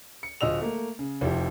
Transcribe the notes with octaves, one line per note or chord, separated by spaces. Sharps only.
C#7
D1 F4 D#5 E6 F7
A3 A#3
C#3
F1 F3 E4 G4